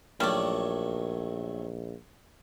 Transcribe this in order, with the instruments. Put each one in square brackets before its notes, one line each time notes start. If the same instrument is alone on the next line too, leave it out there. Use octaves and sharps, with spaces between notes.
[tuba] A#1 [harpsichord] D#3 F#3 A3 [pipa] G3 D5